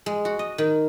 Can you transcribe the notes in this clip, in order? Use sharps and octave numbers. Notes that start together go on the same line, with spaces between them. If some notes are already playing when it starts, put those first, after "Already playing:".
G#3
F#4
D#5
D#3